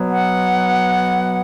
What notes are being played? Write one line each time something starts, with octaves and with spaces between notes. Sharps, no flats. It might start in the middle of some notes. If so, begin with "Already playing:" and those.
Already playing: B2 F#3 B3
F#5